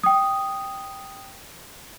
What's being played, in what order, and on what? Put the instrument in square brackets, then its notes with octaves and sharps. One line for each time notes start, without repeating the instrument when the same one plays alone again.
[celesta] G5 D#6